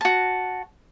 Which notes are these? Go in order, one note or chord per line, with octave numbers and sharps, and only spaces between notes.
F#4 A5